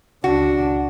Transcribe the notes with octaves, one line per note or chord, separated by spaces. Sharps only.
C#2 D4 F#4